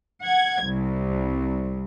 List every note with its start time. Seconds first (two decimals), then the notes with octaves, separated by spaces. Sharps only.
0.22 F#5 G#6
0.65 C2